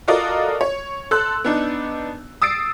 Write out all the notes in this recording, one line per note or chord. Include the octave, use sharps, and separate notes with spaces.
F4 F#4 A4 A#4 D5 D#5
C#5
A4 C6 E6 F#6
B3 D4 D#4
D#6 E6 A6 C7 D7